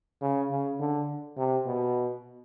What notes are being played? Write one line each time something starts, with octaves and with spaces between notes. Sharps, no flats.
C#3
C#3
D3
C3
B2